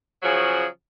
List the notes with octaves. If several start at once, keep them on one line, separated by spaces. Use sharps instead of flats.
C#3 F3 F#3 G#4